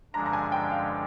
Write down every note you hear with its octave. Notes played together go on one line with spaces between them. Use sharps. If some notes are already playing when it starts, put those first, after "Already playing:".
G2 D3 F3 G#3 D4 A#5
A#5
G#5
G5
F5